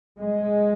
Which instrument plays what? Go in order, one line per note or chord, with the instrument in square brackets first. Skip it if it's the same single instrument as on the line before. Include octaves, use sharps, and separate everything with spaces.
[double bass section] G#3